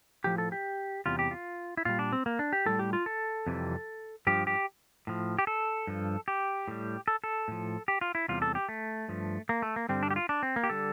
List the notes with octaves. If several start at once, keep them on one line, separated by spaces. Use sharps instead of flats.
A2 F3 G4
A4
G4
E2 C3 G3 F4
G4
F4
E4
A#2 G3 F4
D4
C4
A#3
D4
G4
A2 G3 A4
G4
F4
A4
F2 C3 E3 G3
G2 F3 G4
G4
A2 F3
G4
A4
G2 F3
G4
A2 G3
A4
A4
A2 F3
G4
F4
E4
E2 C3 G3 F4
A4
G4
A3
G2 F3
A#3
A3
A#3
G2 D3 G3 C4
D4
G4
F4
D4
C4
A#3
G4
D3 G3 A4